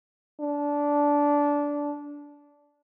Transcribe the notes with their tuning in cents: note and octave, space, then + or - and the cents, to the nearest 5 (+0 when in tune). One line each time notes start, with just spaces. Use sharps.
D4 -15